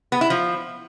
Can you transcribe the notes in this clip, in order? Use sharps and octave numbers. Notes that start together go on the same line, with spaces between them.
B3
E4
F3